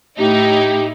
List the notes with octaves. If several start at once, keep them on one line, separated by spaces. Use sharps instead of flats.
A2 D#4 E4 G4